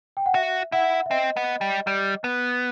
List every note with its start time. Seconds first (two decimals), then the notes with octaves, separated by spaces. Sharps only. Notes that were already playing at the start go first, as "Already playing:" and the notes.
0.17 G5
0.26 F#5
0.35 F#4 E5
0.72 E4 F#5
1.06 E5
1.10 C4 D#5
1.37 B3
1.61 G3
1.87 G3
2.24 B3